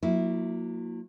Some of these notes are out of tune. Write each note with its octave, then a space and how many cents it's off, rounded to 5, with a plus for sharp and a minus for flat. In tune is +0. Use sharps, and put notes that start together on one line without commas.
F#3 -35 A#3 +0 E4 -5